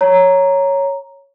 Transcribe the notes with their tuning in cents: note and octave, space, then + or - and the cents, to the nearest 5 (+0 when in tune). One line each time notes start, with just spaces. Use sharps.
C#5 +0 A#5 +0